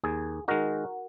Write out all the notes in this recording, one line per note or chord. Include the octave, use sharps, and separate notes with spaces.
D#2 G#4
D#3 G#3 D#4 F#4 A#4